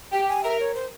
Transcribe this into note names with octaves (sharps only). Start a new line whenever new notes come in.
G4 G5
G#5
A#4 E5
C#5
C5